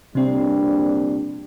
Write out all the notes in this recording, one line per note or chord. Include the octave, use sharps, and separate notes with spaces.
A#1 C3 G3 C4 D4